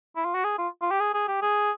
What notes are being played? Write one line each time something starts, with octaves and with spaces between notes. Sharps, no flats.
E4
F4
F#4
G#4
F4
F4
G4
G#4
G#4
G4
G#4